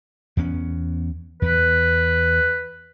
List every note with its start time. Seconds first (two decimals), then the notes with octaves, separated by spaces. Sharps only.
0.37 E2 B3 C#4
1.42 E2 B4